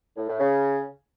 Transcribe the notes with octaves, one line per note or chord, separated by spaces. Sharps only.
A2
A2
C#3